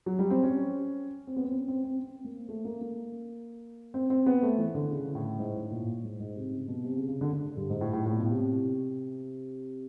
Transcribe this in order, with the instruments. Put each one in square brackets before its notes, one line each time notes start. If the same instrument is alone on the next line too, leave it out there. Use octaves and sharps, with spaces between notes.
[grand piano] F#3
G3
C4
C#4
C4
B3
C4
C#4
C4
C4
C4
A#3
A3
A#3
A#3
C4
C4
B3
A3
E3
D3
C#3
A2
G#2
A2
A#2
G#2
G#2
C3
C#3
B2
C3
C#3
C#3
D3
D3
G2
G#2
A2
A2
A2
A#2
B2
C3